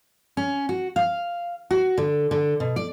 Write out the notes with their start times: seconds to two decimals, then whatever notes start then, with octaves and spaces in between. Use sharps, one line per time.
0.37 C#4
0.69 F#4
0.96 F5
1.70 F#4
1.98 D3
2.31 D3
2.60 B2
2.76 D5